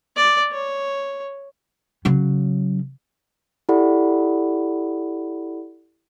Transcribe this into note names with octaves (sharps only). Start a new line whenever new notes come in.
D5
C#5
C#3 F#3
E4 G4 A4 D5 F#5 B5